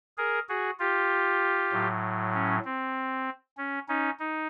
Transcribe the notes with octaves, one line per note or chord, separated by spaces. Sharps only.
G#4 A#4
F#4 G#4
F4 G4
A2 F#3
C#4
C4
C#4
C#4 D#4
D#4